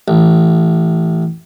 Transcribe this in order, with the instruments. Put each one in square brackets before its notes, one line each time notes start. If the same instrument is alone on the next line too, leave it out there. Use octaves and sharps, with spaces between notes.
[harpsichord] A1